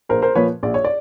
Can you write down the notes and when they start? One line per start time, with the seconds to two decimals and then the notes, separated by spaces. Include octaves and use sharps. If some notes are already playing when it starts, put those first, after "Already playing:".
0.09 A#1 A#4 C5
0.22 A#4 C5
0.35 A#2 F3 B4 C#5
0.63 A#1 D5
0.74 C#5
0.84 D5